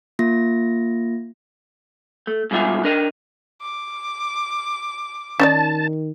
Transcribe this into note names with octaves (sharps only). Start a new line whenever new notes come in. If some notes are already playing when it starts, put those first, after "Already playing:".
A#3 F4 A#6
A3
G#2 B2 G3 F4 E5 G#5
D4 A#4 D#5
D6
D#3 C#4 D#4 D5 A5